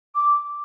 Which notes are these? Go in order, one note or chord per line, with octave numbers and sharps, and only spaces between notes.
D6